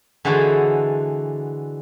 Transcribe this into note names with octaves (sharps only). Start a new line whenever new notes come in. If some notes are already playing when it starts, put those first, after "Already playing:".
D3 E3 G#3 F#4 A4 C5